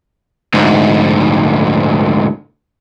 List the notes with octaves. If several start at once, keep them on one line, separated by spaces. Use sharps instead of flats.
D2 G#2